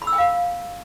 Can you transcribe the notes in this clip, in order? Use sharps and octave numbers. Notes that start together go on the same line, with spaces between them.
B5
E6
G5
F5